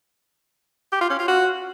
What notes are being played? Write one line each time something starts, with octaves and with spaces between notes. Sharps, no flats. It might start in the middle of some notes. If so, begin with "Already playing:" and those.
G4
F4
C#4
F4
F#4